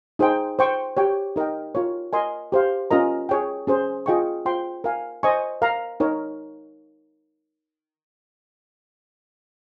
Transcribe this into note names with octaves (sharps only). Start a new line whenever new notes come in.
D#4 G#4 C5 G5
C5 G5 C#6
G4 C#5 G5
D#4 A#4 D#5 G5
F4 A#4 C#5
A#4 D#5 G#5 C6
G4 C5 F5
C#4 F4 A#4 D#5 A#5
G#4 C#5 G5
C#4 G#4 C5
F4 G#4 D#5 G5 C#6
F4 C5 G5 C6
A#4 F5 G#5
C5 D#5 G#5 C#6
A#4 F5 A#5
D#4 A#4 C#5